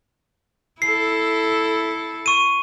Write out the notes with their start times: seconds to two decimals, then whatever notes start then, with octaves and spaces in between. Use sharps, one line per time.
0.82 E4 A4 C7
2.26 C#6 D#7